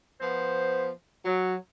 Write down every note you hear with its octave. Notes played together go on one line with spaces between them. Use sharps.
F3 B3 C5
F#3